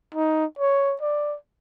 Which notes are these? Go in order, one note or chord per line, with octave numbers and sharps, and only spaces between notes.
D#4
C#5
D5